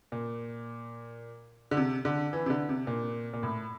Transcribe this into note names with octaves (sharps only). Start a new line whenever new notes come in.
A#2
D3
C3
D3
E3
C3
D3
C3
A#2
A#2
A2